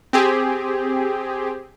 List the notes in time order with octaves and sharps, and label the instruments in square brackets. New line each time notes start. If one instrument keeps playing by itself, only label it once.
[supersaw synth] C4 G4 G#4